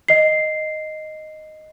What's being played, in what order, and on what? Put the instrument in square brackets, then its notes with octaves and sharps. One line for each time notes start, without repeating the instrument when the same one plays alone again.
[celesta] D#5 C7